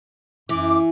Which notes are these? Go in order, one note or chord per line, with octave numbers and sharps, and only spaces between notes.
F#2 E3 D6